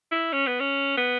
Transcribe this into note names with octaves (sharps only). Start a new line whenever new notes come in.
E4
C#4
B3
C#4
B3